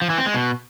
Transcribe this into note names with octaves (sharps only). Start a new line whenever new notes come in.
F3
E3
C4
G#3
B2